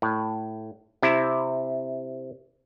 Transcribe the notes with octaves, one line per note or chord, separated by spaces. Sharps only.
A2
C3 E4